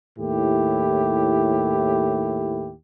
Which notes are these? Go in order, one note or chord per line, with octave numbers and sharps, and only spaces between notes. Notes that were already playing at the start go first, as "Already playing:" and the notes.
D#2 A2 E4 G4